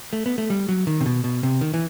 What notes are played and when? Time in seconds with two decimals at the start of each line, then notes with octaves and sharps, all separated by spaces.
0.13 A3
0.26 B3
0.38 A3
0.50 G3
0.68 F#3
0.87 D#3
1.01 C3
1.06 B2
1.24 B2
1.43 C3
1.61 D#3
1.74 E3